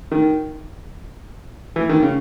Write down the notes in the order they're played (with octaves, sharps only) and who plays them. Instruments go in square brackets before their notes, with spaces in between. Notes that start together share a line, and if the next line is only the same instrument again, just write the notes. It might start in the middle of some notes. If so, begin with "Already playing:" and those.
[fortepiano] D#3
E3
D#3
C#3